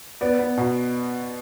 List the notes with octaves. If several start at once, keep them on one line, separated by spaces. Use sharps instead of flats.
B3 D5
B3
B2